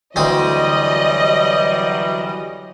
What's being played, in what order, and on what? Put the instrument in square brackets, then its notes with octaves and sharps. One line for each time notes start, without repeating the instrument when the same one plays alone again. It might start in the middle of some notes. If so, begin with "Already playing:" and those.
[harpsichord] D2 C4 D#6 [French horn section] E3 F#3 [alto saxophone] G3 [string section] D#5